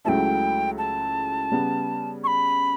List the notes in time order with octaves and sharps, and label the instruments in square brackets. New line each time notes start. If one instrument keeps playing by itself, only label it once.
[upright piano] C#2 C#3 F#3 A3 E4 [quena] G5 A5
[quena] A5
[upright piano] C#3 G3 B3
[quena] C#6
B5